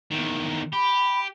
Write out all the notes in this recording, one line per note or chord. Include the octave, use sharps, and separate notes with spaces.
E2 D#3
G4 B5